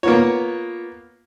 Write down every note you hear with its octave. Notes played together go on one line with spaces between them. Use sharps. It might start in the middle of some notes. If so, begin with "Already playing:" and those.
A#3 B3 F4 C#5